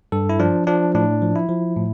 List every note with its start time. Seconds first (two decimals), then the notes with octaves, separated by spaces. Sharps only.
0.12 G2 A4
0.29 E4
0.39 F3 D4
0.67 F3 D4
0.95 A2 D4
1.22 F3
1.36 E4
1.49 F3
1.76 A2